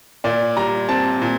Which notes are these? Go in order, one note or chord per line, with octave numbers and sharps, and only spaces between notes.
A#2 D5
G3 A#5
C4 A5
A#2